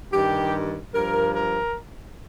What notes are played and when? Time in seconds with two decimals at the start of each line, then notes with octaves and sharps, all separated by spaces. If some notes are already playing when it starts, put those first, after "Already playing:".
0.13 G2 D#3 G4
0.94 G2 F3 A#4
1.35 A#4